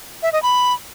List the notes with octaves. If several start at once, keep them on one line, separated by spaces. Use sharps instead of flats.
E5
D#5
B5